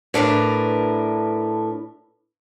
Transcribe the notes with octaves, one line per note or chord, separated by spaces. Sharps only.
A2 D4 A#4 B4